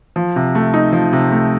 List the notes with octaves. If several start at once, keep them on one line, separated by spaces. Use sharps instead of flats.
F3
C3
A3
D#4
F3
C3
A3